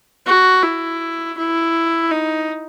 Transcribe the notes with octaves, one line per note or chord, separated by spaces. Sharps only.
F#4
E4
E4
D#4